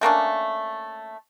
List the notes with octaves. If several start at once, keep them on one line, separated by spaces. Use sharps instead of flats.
A3 A#3 C#4 D4